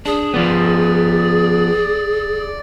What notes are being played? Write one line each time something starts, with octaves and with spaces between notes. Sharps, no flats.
D4 G#4
F3 B3 D5